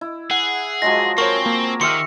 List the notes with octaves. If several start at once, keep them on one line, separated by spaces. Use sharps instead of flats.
E4
G#4 F#5
F3 F#3 G#3 A#6
C4 A#4 C5 C#5 C#6
A#3
D#3 G4 E5 C6 F6 C#7